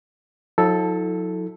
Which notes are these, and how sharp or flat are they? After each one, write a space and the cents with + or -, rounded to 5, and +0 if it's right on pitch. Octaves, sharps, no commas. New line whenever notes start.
F#3 -45 E4 -40 A4 +0